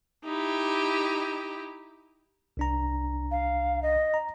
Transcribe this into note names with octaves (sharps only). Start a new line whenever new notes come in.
D#4 E4 G4
C2 D4 A#5
F5
D#5
A#5